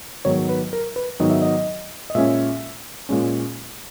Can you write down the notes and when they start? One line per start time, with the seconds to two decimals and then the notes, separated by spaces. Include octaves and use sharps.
0.25 G#2 D#3 F#3 B3 C#5
0.49 B4
0.73 A#4
0.96 B4
1.20 G#2 D#3 F#3 B3 D#5
1.30 E5
1.42 D#5
2.10 D#5
2.15 A#2 G#3 C#4 E5
3.09 A#2 G#3 C#4